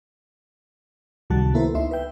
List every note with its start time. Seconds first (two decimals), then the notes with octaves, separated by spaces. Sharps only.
1.30 C#2 C3 D#3 G3 F#4 A5
1.54 A#3 B3 E4 A4 B4 C5
1.74 C#2 D#4 E4 E5 C6
1.91 B4 E5 G5